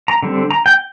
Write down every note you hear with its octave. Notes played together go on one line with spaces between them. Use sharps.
A#5
D3 G3 C4
A#5
G5